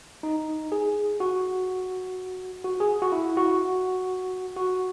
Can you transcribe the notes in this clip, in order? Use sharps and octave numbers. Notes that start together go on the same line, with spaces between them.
D#4
G#4
F#4
F#4
G#4
F#4
E4
F#4
F#4